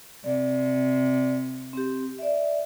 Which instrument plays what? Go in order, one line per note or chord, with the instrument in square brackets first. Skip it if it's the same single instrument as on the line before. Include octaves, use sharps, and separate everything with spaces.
[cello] C3 [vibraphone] D5
[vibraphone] C4 G4
D5 E5